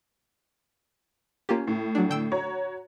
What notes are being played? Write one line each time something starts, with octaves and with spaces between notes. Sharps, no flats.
A#3 C#4 F4 G4
A2
F#3 D4
D3 G5 E6
F#4 C#5 A#5